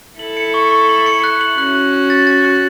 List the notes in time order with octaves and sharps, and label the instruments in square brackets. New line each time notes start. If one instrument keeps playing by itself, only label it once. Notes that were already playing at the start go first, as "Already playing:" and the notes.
[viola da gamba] E4 A4 [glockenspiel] F#7
[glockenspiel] C#7
C#6
C#6
F#7
C#7
F#6
F#7
[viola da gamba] C#4 F#4 [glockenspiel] F#6
[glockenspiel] F#6
F#6
A6
A6
F#6